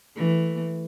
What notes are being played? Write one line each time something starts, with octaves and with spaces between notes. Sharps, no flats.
E3 A3